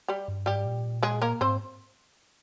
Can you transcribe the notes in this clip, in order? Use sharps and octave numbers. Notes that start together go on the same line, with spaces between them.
G3 G4
G2
G#2 G3 G4
A#2
G#3 G#4
A#3 A#4
G#2 C4 C5